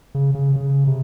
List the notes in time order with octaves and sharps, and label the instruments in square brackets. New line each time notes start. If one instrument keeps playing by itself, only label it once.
[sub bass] C#3
C#3
C#3
C3